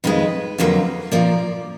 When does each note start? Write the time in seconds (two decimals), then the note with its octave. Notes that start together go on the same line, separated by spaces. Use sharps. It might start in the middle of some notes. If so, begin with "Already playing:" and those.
0.04 F2 D#3 G#3 B4
0.58 F2 D3 F#3 A#3
1.12 A#2 F3 A#3 D5